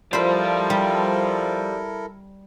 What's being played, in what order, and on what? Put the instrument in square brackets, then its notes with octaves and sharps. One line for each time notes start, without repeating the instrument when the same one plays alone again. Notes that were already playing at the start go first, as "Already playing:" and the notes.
[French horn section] F3 [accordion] E4 A4 A#4 [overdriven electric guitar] G4 D5 [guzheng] C5 B5
[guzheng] G3